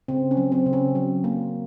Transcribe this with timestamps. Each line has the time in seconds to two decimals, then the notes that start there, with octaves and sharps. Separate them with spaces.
0.08 C#3 C4
0.31 C#4
0.37 F#3
0.52 C4
0.66 C#3
0.73 C#4
0.95 F#3
1.24 A#3